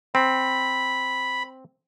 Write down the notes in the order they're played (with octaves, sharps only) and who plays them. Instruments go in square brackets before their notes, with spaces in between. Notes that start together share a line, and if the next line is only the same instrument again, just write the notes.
[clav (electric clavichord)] C4 [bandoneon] B5